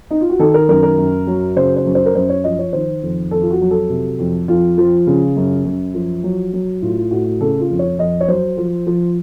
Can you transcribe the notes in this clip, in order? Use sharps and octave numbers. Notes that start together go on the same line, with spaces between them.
D#4
F4
F#4
D#3 A4
A#4
F#2 A#4
A#4
F#2
F#3
C#3 C5
C5
F#2
C5
A#4
F#2 C5
C#5
F3 D#5
C#5
D#3 C5
F2
F2 A4
F4
F#4
F#3
A4
C3
F2
F2 F4
F3
C#3
F#2
F#2
F3
F#3
F#3
A2 F4
F4
A2 F#4
F#4
C#3 A4
F4
F2
C#5
F2 D#5
C#5
F#3 C5
F3
F3